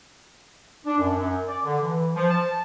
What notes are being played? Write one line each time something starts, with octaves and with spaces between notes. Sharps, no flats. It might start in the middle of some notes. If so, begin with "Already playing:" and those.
D4
F#2
F#2
D5
D3
E3
F3
A5